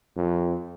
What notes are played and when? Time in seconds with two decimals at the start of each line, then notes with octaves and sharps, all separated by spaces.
0.17 F2